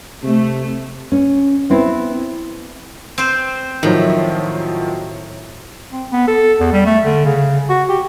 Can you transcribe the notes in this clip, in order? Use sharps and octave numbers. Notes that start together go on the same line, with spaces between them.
C3 A3
C#4
B3 C4 E4
C4 C5
A2 D#3 F3 F#3
C4
B3
A4
E2
G3
A3
D3
C#3
F#4
G4